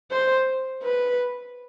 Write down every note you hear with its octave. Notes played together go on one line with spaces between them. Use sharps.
C5
B4